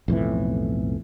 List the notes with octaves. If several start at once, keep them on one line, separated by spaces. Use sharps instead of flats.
B1 F2 A2 E3